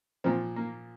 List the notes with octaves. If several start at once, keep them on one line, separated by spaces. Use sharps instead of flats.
A#2 F3 C4
A#3